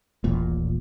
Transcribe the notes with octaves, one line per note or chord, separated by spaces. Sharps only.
D#1 A1 A#2